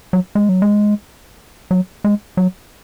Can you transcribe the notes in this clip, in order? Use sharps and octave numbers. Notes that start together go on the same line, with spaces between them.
F#3
G#3
F#3
G#3
F#3
G#3
F#3